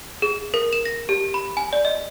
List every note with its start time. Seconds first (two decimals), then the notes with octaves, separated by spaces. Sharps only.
0.22 G#4
0.54 A#4
0.73 E7
0.85 A#6
1.09 G4
1.34 B5
1.57 G#5
1.73 D5
1.85 D#5